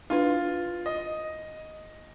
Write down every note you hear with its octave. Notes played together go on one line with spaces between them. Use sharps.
D4 E4 F4 B4
D#5